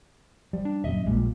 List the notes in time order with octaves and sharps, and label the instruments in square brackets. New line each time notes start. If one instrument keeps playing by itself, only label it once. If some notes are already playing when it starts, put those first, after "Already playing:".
[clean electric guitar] F3 [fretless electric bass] G3
[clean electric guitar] D4
[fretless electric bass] D#1 F#2 [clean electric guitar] D#5 E5
[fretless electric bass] A#1 A#2 [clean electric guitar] G3 G#3